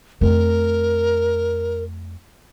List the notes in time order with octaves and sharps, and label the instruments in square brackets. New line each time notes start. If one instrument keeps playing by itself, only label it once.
[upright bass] F2 A3 [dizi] A#4